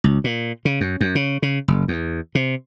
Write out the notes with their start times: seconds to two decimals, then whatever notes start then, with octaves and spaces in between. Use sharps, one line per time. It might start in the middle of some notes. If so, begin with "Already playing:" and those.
0.04 C#2
0.24 A#2
0.65 C#3
0.81 F#2
1.01 F#2
1.15 C#3
1.42 C#3
1.68 F#1
1.88 E2
2.35 C3